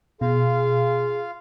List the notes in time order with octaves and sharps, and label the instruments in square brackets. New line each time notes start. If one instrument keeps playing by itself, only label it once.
[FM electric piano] B2 [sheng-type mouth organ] F4 F5 [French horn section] G#4